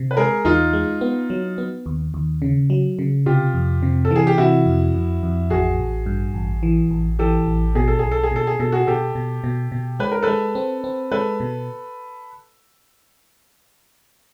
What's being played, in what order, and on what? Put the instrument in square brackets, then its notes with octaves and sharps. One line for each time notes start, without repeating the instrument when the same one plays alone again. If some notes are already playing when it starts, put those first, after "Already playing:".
Already playing: [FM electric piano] C3
[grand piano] B4
[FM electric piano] G#3 [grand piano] G#4 A#4
[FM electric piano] E2 [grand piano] D#4 F4
[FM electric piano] G#3
B3
F#3
B3
D#2
D#2
C#3
F#3
C#3
[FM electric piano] C3 [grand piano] F4 G4
[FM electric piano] F2
C3
[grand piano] A4
[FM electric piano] E3 [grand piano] G#4
[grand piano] G4
[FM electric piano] C3 [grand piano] E4 F#4
[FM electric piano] F2
F2
F2
[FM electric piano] A1 [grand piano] F#4 G#4
[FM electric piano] A1
G2
A1
E3
A1
[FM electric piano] E3 [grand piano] G4 A4
[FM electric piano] A1
[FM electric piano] B2 [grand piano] G#4
[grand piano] A4
[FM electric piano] B1 [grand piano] G#4
[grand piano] A4
G#4
[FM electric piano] B2 [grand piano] A4
[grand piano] G#4
[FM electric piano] B2 [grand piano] A4
[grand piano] F#4 G#4
[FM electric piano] B2 [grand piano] G4 A4
[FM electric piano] B2
B2
B2
[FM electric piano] G#3 [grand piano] B4
[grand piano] A#4
[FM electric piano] G#3 [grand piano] A4 B4
[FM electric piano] C4
C4
[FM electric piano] G#3 [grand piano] A4 B4
[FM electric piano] B2